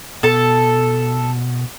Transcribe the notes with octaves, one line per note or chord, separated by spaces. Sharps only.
B2 A4 A5